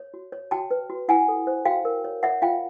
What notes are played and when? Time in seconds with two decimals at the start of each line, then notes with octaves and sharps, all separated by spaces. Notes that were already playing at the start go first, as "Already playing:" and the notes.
Already playing: C#5
0.14 F#4
0.32 C#5
0.51 F#4 G5 A5
0.71 B4
0.90 F#4
1.08 E4 F#5 G#5
1.28 A4
1.47 C5
1.65 F#4 F5 G5
1.85 A#4
2.04 C#5
2.23 C#5 E5 F#5
2.42 F4 F5 G5